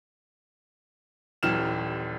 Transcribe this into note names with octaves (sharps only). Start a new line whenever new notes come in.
D#1 D#2 E3 F#3 F6 E7